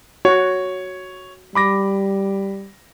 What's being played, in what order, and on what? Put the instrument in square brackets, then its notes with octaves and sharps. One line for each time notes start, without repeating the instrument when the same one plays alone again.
[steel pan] F#4 [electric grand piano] C#5
[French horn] G3 [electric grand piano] B5 D6 A#6